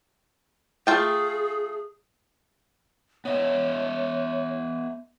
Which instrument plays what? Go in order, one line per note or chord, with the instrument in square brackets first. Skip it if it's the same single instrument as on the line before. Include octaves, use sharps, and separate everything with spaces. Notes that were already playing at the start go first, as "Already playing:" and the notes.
[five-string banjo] A3 F4 G5 [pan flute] G#4
[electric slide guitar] B3 D#5 E5 [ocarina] C#5